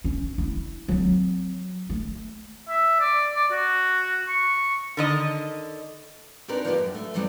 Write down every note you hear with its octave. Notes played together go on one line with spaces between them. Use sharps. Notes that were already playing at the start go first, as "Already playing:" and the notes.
C#4
E4
F#3 C4
A3
E5
D5
D5
F#4
C#6
D3 D#3 D#5
C4 D4 D#4 A#4 B4 C#5
F3 A3 A#3 D#4 F4 G4
F#2
A3
F2 G#2 C3 F#3 G3 A3